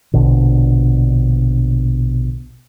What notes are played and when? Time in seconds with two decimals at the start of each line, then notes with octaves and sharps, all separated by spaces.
0.14 A#1 B2 D3